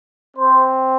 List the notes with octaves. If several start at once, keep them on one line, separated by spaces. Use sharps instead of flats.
C4 C5